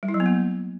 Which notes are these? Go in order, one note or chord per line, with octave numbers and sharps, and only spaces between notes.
G3
E4
F#3
B3
A#3